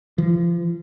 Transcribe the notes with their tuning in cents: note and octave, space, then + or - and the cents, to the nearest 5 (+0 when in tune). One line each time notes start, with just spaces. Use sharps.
F3 -30